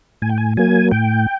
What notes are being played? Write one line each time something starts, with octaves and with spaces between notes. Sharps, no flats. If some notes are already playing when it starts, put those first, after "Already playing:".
A2 G#5
G5
G#5
F#3 A#3 G#5
A2 G5